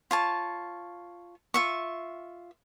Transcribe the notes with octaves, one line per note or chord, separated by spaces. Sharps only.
F4 C#5 A5
F4 E5 C#6